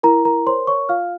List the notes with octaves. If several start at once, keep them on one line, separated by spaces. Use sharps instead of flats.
E4 A#4 A#5
A#4 A#5
A#4 C5 C#5 C6
C#5 C#6
F4 F5 F6